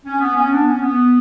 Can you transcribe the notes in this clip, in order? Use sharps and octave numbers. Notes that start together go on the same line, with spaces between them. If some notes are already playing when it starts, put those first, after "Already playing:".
C#4
B3
C#4
B3 D4
C#4
B3